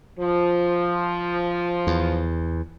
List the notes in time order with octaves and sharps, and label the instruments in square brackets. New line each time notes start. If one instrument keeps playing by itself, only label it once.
[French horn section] F3
[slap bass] E2